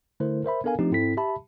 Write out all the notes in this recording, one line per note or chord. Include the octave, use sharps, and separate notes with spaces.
D3 A3 E4 A#4 C5
A#4 C5 E5 B5
B3 D4 A4 A#4 F5 G#5
F3 A3 C4 D4 D#4 G4
G#2 C4 E4 A4 B6
G4 E5 A5 B5